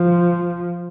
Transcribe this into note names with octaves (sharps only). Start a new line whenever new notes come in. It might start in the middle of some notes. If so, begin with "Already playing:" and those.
Already playing: F3